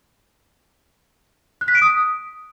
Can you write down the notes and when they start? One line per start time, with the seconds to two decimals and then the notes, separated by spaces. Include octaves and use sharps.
1.61 F#6
1.68 B6
1.75 D7
1.82 D#6